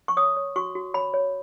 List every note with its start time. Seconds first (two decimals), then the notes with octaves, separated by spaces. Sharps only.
0.08 C#6
0.17 C#5 D#6
0.37 C#5
0.56 F#4 C#6
0.75 F#4
0.94 C#5 B5
1.14 C#5